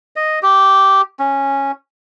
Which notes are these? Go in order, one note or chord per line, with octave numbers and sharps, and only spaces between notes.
D#5
G4
C#4